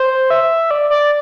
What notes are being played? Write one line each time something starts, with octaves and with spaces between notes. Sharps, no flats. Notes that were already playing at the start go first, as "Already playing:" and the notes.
Already playing: C5
E5
D5
D5